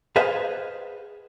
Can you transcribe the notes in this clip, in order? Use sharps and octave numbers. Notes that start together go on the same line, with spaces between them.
G#4 B4 C5 D#5 F5 F#5